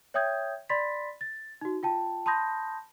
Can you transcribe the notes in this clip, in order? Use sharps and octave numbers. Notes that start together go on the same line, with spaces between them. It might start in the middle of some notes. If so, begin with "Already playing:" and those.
C#5 E5 G5 D#6 G6 G#6
D5 B5 C6 A6 B6
A6
D#4 F#4
F4 G5 A5
A5 B5 C6 D#6 G6 A#6